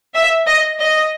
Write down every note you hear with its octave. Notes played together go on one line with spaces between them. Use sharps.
E5
D#5
D#5